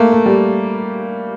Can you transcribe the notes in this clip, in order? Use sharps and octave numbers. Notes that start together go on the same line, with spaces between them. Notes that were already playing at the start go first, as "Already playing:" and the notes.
Already playing: A3 A#3
A3
G3